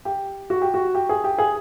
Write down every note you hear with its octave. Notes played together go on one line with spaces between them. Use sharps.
G4
F#4
G4
F#4
G4
G#4
G4
G#4